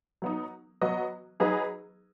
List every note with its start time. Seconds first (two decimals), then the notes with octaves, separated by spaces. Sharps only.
0.22 F#3 B3 D#4
0.82 F#3 B3 F#4 B4 D#5
1.40 F#3 D#4 G#4 B4 D#5